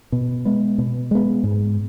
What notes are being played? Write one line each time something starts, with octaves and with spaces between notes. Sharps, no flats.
B2
G#3 B3
B2
G#3 B3
G#2